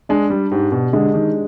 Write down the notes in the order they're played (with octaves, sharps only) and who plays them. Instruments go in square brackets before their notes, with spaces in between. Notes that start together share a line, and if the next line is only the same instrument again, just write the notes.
[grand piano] G#3 [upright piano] D4
[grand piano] G3
[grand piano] G#2 [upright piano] G4
[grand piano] B2
[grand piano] D3 [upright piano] G#3
[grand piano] D#3